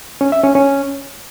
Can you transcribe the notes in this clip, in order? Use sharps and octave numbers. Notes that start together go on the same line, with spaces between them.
C#4
E5
C#4
C#4